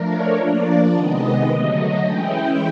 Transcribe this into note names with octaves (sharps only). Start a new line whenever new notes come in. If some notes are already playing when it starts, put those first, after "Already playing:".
Already playing: F3 A3 D4 A#4
C#5
F3 A#3 D4 D5
C3 D#3 G#3 B3 D#5
D3 F#3 A3 D#5
E3 G#3 C#4 E4 G5